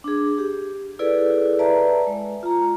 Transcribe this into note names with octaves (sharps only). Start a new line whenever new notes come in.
D4 G#4
G4
E4 G#4 A4 B4 D5
B4 D5 E5 A5 A#5
G#3
F4 A#5